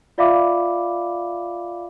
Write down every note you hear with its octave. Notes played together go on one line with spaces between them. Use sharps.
F4 D5 E5 F5 B5 D6